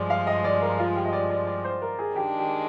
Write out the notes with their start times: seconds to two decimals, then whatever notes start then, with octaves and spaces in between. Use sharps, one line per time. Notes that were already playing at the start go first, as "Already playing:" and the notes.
Already playing: G2 F3 G#3 D5
0.10 F5
0.27 D#5
0.44 D5
0.62 A#4
0.79 F4
0.96 G4
1.05 D#5
1.13 D5
1.30 D5
1.47 D5
1.64 C5
1.82 A#4
1.99 G#4
2.16 D#3 G#3 D4 G4
2.39 G4